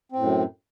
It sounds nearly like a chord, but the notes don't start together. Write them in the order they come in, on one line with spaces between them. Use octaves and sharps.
C4 A2 F#2